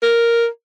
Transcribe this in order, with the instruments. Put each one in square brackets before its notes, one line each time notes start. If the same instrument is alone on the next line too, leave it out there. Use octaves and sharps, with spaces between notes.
[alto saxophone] A#4